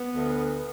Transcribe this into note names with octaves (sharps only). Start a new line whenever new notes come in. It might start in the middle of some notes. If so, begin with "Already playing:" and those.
Already playing: B3
D2